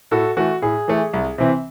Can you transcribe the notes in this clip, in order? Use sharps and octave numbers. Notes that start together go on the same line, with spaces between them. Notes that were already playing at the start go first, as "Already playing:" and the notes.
A2 F#4 A4
E3 A3 F#4
A2 G#4
E3 A3
C2
C3 E3 C4